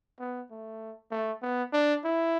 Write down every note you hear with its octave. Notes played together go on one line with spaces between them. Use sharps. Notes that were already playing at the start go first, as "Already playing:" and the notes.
B3
A3
A3
B3
D4
E4